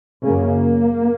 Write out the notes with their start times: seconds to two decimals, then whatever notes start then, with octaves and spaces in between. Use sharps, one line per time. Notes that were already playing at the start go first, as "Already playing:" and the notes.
0.23 F#2 C#3 A#3